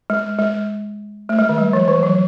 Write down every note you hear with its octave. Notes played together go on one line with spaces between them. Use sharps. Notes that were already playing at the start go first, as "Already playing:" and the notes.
G#3
G#3
A3
G#3
D#3
G3
F3
E3
F#3